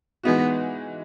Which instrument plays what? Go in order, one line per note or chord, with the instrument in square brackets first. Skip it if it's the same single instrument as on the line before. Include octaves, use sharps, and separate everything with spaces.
[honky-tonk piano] E3 G#3 D#4 F#4 [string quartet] B3